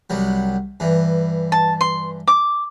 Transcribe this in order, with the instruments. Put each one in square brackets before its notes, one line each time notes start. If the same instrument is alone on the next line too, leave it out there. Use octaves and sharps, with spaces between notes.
[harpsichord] C2 F#3 G3
G2 E3
[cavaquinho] A5
C6
D6